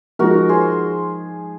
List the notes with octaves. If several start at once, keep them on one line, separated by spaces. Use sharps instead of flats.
F3 G#3 D#4 F#4 A#4
G#4 C5